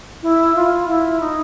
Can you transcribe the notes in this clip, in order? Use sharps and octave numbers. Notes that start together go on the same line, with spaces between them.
E4
F4
E4
D#4